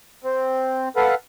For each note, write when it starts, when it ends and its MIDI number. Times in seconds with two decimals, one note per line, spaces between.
0.24 0.89 60
0.96 1.15 69
0.96 1.15 71
0.96 1.15 77
0.96 1.15 78